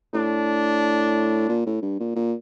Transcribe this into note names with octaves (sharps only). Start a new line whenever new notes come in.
A2 D4
A#2
A2
G2
A#2
A#2